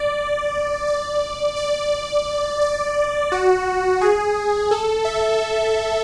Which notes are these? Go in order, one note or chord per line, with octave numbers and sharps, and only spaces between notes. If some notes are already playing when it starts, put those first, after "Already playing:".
Already playing: D5
D5
D5
D5
F#4
G#4
A4
E5